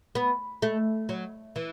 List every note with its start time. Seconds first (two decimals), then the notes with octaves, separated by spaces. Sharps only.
0.15 B3
0.62 A3
1.09 F#3
1.56 E3